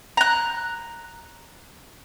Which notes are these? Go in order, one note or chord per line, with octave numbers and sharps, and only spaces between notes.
A#5 F#6